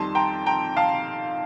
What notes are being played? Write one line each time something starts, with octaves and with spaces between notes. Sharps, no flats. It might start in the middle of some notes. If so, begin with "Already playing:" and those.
Already playing: F2 D#3 G3 A5 C6
G5 A#5
G5 A#5
F5 A5